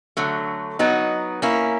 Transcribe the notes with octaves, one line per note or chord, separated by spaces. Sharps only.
D3 F#3 A3
F#3 B3 D#4
A#3 C#4 E4